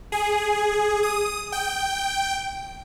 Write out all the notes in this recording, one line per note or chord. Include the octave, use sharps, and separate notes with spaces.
G#4
D#6
G5